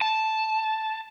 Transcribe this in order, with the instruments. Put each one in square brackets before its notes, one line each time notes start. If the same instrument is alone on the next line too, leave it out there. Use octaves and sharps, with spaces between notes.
[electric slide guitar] A5